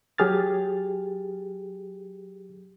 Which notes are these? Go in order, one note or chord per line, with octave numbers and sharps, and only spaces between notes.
F#3 G4 G#4 F6 A6